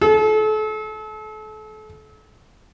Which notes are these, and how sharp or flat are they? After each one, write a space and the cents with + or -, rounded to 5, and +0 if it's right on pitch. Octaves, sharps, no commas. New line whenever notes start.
A4 -35